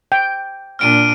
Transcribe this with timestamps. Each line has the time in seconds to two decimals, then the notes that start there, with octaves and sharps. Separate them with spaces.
0.12 G5
0.79 A#2 D4 F6 D7 D#7